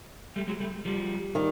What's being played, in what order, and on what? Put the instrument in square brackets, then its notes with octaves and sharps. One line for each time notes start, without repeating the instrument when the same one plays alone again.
[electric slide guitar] G3 A3
F#3 G#3
G3 A3
F3 G3
[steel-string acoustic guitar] D#3 G3